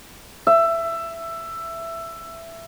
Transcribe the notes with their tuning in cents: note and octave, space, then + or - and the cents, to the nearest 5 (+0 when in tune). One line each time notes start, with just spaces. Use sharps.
E5 +15